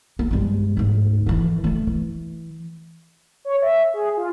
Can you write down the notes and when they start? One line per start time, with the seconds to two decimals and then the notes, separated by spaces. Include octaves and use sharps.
0.19 A#3
0.31 G2 G#3
0.77 D2 G#2
1.26 D3 E3
1.64 D3 A3
1.87 E3
3.45 C#5
3.62 E5
3.94 G#4
4.17 F4